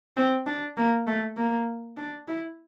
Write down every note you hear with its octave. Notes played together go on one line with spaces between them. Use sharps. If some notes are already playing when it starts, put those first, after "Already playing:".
C4
D4
A#3
A3
A#3
D4
E4